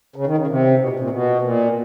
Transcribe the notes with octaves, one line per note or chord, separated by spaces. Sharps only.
C#3
D#3
C#3
C3
B2
A#2
A#2
B2
A#2